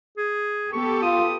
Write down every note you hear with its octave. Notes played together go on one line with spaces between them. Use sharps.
G#4
B3 G4 A4 C#6
F4 D#6